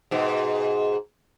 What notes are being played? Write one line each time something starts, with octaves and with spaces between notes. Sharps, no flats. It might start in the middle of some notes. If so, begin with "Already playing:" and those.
G#2 B2